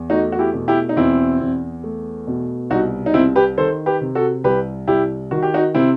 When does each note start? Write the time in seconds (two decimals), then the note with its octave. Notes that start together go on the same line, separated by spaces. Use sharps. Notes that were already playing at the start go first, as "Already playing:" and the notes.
Already playing: E2
0.10 A3 D#4 F#4
0.32 F#4
0.39 E4 G4
0.54 B2
0.68 E4 G4
0.89 D#4
0.97 E2 C4 E4
1.41 E2
1.83 A3
2.27 B2
2.70 C2 D#4 F#4
3.06 D#4
3.14 C2 C4 E4
3.36 G4 B4
3.57 D#3 A4 C5
3.86 G4 B4
4.01 C3
4.15 F#4 A4
4.44 C2 G4 B4
4.88 C2 E4 G4
5.31 D#3 F#4
5.43 G4
5.54 D#4 F#4
5.74 C3 C4 E4